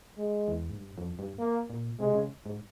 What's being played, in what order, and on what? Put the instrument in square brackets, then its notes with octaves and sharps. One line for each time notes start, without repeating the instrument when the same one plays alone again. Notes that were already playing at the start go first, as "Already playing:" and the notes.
[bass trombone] G#3
[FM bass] E2
G#2
G2
F2
G2
[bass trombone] A#3
[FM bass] A#2
[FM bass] C3 [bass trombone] G#3
[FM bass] C#3
G#2